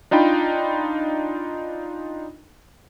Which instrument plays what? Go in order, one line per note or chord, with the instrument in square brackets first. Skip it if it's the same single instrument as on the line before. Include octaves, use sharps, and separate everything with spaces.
[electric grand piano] D4 D#4 F4 G5 B5